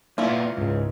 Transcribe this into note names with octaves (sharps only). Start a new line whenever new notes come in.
A#3 B3 E4 F4 D5
C#2 G#2